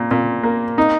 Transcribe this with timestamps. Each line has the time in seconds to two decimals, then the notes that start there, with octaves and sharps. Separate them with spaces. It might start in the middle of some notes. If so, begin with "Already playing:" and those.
Already playing: A#2
0.11 A#2
0.43 A#3
0.78 D#4